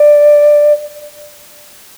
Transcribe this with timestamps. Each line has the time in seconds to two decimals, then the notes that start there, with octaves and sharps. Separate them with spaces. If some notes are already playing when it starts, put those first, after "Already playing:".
Already playing: D5